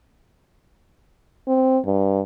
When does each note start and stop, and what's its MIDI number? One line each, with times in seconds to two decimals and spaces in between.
1.48 1.79 60
1.85 2.21 43